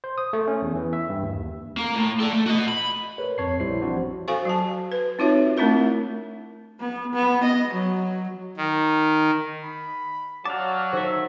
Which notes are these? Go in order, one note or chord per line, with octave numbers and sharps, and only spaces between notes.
C5
D#6
A3
C#4
E2
E3
E5
G2
D#2
A#3 A#4
A2
A4 D5
A3
F#4 D#5
B5
G#4 A#4 B4 C#5
F2 C4 C#5 A5 C7
A#1 G3 E4 C5 C7
E3 F3 C4 D4 F#4 C5
F#4 A4 C5 F5 G#5 C#6
F#3 F#4 A5
B4
C4 D#4 F4 F#4 C#5 E5
A3 C4 D4 E4 A#4 E5
B3
B3
D#5
F#3
D#3
B5
F#3 D5 F5 A5 D6
D#3 A4 C5 E5